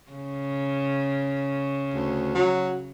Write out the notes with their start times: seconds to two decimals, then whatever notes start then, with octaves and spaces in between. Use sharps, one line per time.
0.12 C#3
1.94 D2
2.35 F#3